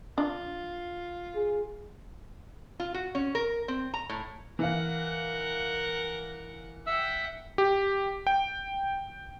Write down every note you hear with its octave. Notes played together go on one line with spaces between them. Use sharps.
D4 F4 D5
G#4
F4
F#4
C#4
A#4
C4
A#5
A2
E3 A#4 F5 F#5
E5 F#5 G5 E6
G4
G5